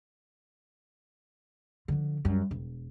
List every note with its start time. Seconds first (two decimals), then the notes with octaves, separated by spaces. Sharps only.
1.88 D3 F3
2.25 F#2 G3
2.51 E1